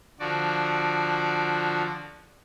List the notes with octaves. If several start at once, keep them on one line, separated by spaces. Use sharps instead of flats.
D3 F3 F#4 D5